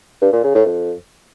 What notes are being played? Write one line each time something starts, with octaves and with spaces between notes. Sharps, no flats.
G2
A#2
C#3
A2
F2